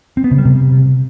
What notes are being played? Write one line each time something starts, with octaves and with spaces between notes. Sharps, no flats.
C4
B3
C#3
G3
C3